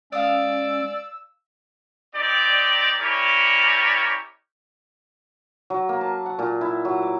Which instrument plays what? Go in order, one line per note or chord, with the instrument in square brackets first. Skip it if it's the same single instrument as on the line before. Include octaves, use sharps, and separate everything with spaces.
[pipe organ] G#3 C#4 [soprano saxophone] D5 [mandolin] F5 D#6 [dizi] E6
[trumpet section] C4 D#4 G4 D5
C#4 E4 G4 A#4 C#5 D5
[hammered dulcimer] F#3
A#3
A5
F#5
A#2
E4
F#3
D6